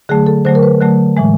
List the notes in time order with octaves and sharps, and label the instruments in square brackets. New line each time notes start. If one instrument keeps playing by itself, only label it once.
[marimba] D3 F#3 A3 G#4
A4
D3 F#3 A3 C5
A#4
B4
D3 F#3 A3
A2 E3 G#3